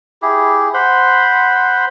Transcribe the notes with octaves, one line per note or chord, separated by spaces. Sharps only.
E4 G4 G#4
C5 F#5 B5 C6